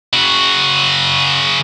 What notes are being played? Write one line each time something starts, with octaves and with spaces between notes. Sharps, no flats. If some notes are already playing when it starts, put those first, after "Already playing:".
C#3 F#4